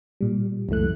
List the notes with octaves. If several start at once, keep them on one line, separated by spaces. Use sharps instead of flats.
A#2 G3
C#2 F#2 E3 A3 F#6